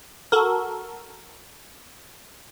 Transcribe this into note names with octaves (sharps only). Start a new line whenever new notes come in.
F#4 A4 A#4